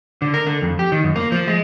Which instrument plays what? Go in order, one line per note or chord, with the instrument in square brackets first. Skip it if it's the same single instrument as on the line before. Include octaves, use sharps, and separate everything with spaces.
[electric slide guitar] D3
A#4
D3
F2
G4
D#3
F#2
A#3
F3
G#3